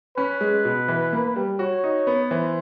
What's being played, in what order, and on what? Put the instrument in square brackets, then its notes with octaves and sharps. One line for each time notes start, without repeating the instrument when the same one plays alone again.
[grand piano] C#4 [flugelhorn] B4
[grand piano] G#3
B2
E3
A#3
G3
[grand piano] F#4 [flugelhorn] C#5
[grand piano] D#4
B3
[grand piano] E3 [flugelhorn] C5